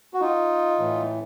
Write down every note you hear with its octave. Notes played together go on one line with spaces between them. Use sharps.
F#4
D#4 F4
A2 E3